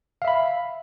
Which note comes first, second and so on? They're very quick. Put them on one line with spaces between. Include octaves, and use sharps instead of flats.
F5 E5 B5